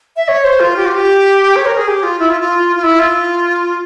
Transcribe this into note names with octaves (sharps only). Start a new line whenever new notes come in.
E5
C#5
C5
F4
G4
F4
G4
C#5
A#4
G#4
G4
F4
E4
F4
F4
F4
E4
F4